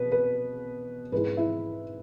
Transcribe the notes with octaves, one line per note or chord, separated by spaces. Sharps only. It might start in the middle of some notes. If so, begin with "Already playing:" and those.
Already playing: B2 B4
B4
G#2 G#3 E4 B4
E4 E5